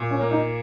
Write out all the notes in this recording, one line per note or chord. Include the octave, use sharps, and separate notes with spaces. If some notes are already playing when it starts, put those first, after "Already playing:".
Already playing: A#2
C#4
A#3
D#4